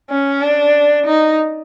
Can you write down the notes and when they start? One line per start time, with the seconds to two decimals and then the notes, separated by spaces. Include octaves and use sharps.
0.10 C#4
0.42 D4
1.06 D#4